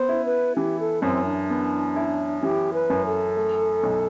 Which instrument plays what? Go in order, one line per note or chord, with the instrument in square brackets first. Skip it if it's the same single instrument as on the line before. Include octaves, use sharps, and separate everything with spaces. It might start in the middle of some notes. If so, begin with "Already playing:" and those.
Already playing: [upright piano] B3 [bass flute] C5
[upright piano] E4
[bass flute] B4
[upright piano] E3 [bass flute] G4
[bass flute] A4
[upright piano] F#2 [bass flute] C4
[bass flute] D4
[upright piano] B3
E4
[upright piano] E3 [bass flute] G4
[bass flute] B4
[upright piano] F#2
[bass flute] A4
[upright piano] A3
B1